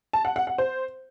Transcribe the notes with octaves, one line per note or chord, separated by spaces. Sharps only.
A5
F#5
F#5
F#5
C5